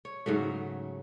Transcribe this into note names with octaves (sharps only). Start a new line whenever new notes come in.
C#5
G#2 C#3 F#3 A3